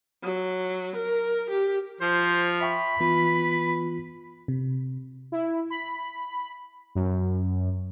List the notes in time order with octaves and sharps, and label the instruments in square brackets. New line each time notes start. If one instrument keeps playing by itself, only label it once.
[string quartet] F#3
A#4
G4
[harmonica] F3 [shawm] C5
[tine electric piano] E5 G5 C#6 [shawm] B5
[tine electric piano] E3 B3 F4 [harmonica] B4
[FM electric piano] C3
[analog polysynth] E4
B5
F#2